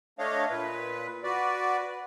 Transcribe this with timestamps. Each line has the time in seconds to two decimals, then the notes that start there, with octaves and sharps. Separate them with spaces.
0.19 A3 D4 C#5 D#5 F5
0.50 A#2 B4
1.24 F#4 B4 D5